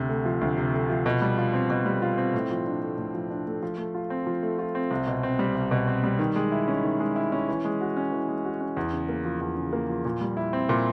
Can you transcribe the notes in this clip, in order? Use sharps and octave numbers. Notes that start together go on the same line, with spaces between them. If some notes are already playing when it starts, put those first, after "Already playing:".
Already playing: D2 C3
A3
F3
D2
C3
A3
F3
B2
G3
F4
C4
B2
G3
F4
C4
A2
F3
D4
A3
A2
F3
D4
A3
F3
A3
F4
C4
F3
A3
F4
C4
C2
B2
C4
G3
C2
B2
C4
G3
D#3
G#3
E4
C#4
D#3
G#3
E4
C#4
E3
G#3
F#4
C#4
E3
G#3
F#4
C#4
E2
C#3
A#3
F3
E2
C#3
A#3
F3
A#2
G3
E4
C4
A#2